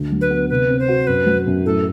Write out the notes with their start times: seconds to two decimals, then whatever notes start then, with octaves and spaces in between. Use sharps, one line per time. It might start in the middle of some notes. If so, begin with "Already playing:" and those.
Already playing: D2
0.12 F#3
0.21 B4
0.30 B3
0.49 C3 B4
0.70 C4
0.79 C5
0.88 F#4
1.07 F#2 B4
1.26 F#3
1.47 F#2
1.65 A2 A4